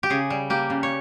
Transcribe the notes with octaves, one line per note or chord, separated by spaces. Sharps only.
G4
C#3 G#4
G3
A#3 G4
C#3
C#5